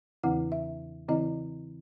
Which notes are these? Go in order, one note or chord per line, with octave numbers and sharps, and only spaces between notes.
E2 C#3 E3 C4 E4 F#5
E5
C#3 E3 C4 E4 D#5